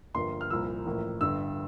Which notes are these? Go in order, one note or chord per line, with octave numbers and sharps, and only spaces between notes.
G1 G2 F3 A#3 C6
F6
C2 A#2 F3 A#3 E6
A1 A2 F3 A#3
G1 G2 D3 E6